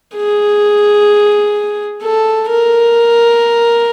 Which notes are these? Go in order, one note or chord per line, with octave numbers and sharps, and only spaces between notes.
G#4
A4
A#4